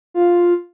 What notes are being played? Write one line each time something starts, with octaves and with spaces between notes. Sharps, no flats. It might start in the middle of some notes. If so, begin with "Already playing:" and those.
F4